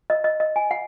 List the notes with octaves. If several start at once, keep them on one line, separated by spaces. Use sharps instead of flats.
D#5
D#5
D#5
G#5
F#5